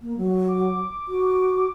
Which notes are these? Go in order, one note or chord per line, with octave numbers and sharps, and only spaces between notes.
A#3
F#3
D6
F#4